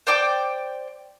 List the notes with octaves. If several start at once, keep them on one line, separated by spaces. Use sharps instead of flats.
C5 D5 G5 D6